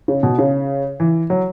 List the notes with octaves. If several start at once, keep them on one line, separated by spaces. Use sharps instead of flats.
C#3
B2
C#3
E3
F#3